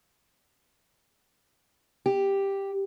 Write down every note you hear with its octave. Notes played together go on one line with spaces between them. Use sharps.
G4